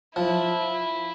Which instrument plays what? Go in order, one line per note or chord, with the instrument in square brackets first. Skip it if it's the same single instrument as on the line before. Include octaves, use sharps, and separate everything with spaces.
[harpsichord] F3 [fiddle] E4